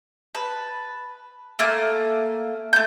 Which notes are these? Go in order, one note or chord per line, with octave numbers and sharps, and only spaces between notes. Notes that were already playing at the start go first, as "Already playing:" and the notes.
B4 A5
A3 A#3 G#5
A3 G6